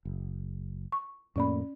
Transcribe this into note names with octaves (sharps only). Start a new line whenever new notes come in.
F#1
C#6
F2 A2 A#3 C#4 D5 B5